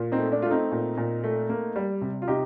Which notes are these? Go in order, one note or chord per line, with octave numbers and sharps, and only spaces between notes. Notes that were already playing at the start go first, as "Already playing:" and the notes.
Already playing: A#2
C4 D#4
A3
D4
A3 F4
C4 D#4
A#2
A#2
A3
A#3
G3
C3
F4
C3 D#4 G4